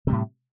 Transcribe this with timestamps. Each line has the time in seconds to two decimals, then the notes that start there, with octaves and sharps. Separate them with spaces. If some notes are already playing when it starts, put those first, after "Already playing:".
0.07 C3
0.10 G3
0.12 A2